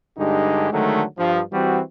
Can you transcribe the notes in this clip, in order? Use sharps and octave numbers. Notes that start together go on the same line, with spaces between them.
G2 D3 G#3 D#4 G4
D3 D#3 F#3 G#3 A3
G2 F3
E3 G3 C4 F#4